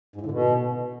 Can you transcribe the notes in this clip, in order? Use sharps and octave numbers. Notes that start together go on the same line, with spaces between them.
G#2
A2
D3
B2